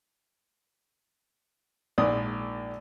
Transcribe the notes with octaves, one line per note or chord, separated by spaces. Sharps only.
A#1 G#2 D5 D#6